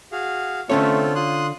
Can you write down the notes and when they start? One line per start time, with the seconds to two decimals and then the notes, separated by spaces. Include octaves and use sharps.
0.12 F#4 G#4 F5
0.70 D3 A3 C4 C#4 F4 A4 C#5
1.15 F4 C6 D#6 F#6